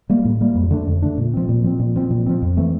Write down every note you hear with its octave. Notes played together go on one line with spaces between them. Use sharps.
G3 A#3
A2
G3 A#3
F2
D3 A3 D4
F2
D3 A3 D4
A#2
F3 C4
A#2
F3 C4
A#2
F3 C4
A#2
F3 C4
F2
E3 A3 C4